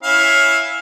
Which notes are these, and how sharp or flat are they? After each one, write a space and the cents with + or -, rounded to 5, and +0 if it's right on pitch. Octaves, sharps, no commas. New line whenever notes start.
C#4 -5 E4 +0 F5 +15